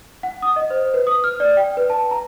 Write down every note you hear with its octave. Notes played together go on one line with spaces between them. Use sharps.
F#5
D#6
D#5
C5
B4
D#6
F6
D5
G5
B4
A5
A#5